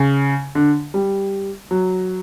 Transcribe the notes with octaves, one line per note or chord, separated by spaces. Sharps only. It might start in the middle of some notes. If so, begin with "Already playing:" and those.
Already playing: C#3
D3
G3
F#3